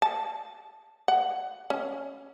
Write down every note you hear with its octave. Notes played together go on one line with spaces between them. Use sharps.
A5
F#5
C#4